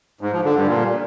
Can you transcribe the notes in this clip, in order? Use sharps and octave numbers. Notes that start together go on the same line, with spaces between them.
G#2
F3
D3
G2
A#2